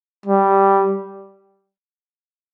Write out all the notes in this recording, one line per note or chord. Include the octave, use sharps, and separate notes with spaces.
G3